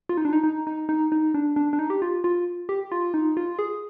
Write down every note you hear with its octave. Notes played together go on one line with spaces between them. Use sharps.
F4
D#4
D4
D#4
D#4
D#4
D#4
D#4
D4
D4
D4
D#4
G4
F4
F4
G4
F4
D#4
F4
G#4